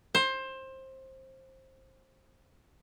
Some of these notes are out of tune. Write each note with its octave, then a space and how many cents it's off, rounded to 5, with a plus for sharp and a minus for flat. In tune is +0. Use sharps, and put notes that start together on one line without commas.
C5 +20